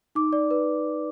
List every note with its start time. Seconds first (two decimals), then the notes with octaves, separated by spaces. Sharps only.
0.15 D#4 D6
0.33 D5
0.51 B4